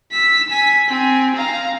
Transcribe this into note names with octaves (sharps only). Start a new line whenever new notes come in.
E6 B6
G#5 B6
C4 G#5
F5 A#5